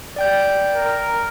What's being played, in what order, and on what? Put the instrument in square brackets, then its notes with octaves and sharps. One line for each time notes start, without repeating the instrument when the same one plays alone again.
[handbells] D5 G5 G6
[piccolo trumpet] A#4